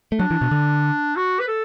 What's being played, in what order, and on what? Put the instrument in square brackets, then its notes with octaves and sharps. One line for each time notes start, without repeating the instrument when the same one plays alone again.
[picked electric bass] A3
[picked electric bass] F#3 [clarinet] D4
[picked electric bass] E3
B2
D3
[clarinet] F#4
B4
A4